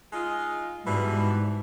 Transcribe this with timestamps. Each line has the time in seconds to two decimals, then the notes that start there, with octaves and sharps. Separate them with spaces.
0.12 G#3 D#4 F4
0.86 G#2 B2 E3 G3